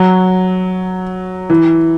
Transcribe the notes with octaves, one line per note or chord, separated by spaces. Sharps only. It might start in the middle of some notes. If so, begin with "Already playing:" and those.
Already playing: F#3
E3